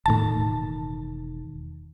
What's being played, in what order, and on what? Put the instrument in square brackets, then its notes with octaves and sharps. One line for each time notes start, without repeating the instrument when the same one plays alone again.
[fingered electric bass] E1 D#3 [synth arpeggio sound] A2 A5